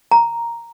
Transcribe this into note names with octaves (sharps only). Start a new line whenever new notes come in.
A#5